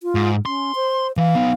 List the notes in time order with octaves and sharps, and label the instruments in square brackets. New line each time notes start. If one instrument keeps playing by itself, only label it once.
[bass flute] F4
[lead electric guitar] G#2
[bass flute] C#4 [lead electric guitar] C6
[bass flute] C5
[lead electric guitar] E3 [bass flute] F5
[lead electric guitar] B3 D#4